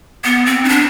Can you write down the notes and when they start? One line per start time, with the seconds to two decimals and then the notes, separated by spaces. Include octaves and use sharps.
0.24 B3
0.46 C4
0.64 D#4
0.69 D4